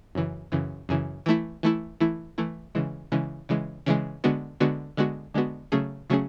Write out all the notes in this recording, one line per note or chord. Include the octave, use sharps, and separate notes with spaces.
F#2 C#3 E3
F#2 C#3 E3
F#2 C#3 E3
E3 A3 E4
E3 A3 E4
E3 A3 E4
E3 A3 E4
C#3 E3 G#3
C#3 E3 G#3
C#3 E3 G#3
C#3 E3 G#3
D3 G#3 B3 F#4
D3 G#3 B3 F#4
D3 G#3 B3 F#4
D3 G#3 B3 F#4
C#3 F#3 A3 C#4 G#4
C#3 F#3 A3 C#4 G#4